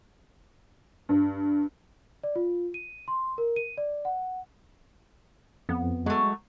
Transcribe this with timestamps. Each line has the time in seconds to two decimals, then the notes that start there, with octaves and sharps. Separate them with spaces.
1.09 G2
2.24 D5
2.36 F4
2.74 D#7
3.08 C6
3.38 A#4
3.56 D#7
3.78 D5
4.05 F#5
5.69 F2 B3
6.06 F#3 G#3 A3